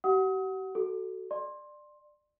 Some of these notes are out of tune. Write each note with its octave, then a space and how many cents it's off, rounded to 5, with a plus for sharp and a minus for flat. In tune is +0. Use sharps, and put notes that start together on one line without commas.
G4 -45 F#5 +0 D#6 +35
F#4 +20 A4 +0
D5 +20 C6 +15